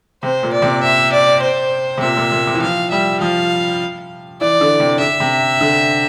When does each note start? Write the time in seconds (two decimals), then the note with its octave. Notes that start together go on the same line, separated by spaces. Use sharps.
0.23 C3 C5
0.43 A#2
0.53 D5
0.62 C3
0.83 E5
1.12 D5
1.42 C5
1.98 C3
2.02 A#2 E5
2.17 A#2
2.32 A#2
2.47 C3
2.55 E3
2.61 F3 F5
2.91 G3 E5
3.21 F3 F5
4.41 E3 D5
4.61 D3
4.80 C3
5.00 D3 E5
5.20 C3
5.61 D3